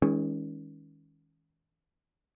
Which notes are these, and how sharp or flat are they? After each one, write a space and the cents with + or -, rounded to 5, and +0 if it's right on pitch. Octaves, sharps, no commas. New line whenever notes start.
D#3 +35 G#3 -15 C#4 +5